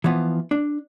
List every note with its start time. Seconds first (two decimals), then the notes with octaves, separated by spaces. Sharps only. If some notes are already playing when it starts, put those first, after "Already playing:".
0.04 E3 F3 B3 F4
0.51 D4